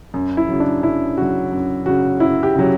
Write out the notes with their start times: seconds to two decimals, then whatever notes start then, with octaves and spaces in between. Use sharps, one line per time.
0.14 F#2
0.37 E4
0.49 C#3 F#3
0.60 D4
0.83 F#2 E4
1.17 C#3 F#3 F#4
1.52 F#2
1.86 C#3 F#3 F#4
2.20 F#2 E4
2.43 G4
2.55 C#3 F#3